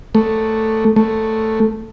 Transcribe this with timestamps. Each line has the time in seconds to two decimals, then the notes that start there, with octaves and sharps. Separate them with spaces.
0.15 A3
0.96 A3